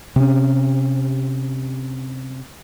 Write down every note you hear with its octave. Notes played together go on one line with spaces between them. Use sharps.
C3 C#4